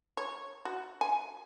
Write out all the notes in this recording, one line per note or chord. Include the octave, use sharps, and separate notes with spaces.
C#5
F#4
G#5